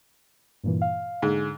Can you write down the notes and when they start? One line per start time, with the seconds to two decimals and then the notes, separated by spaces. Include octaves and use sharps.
0.64 G2 A#2 E3
0.82 F5
1.22 G#2 D3